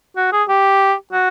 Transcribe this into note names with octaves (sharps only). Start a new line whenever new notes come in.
F#4
G#4
G4
F#4